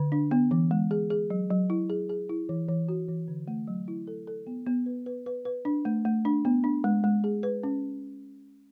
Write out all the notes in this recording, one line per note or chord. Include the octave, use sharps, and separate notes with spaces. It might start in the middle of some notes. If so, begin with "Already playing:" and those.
Already playing: D3
D4
B3
E3
G#3
G#4
G#4
F#3
F#3
E4
G#4
G#4
E4
E3
E3
F#4
E3
D3
A3
F#3
E4
A4
A4
B3
B3
B4
B4
B4
B4
D4
A3
A3
D4
B3
D4
G#3
G#3
G#4
B4
C#4